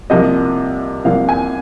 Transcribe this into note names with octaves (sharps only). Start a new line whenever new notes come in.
C2 C3 F3 A#3 D#5
C2 C3 F3 A#3 F5
G#5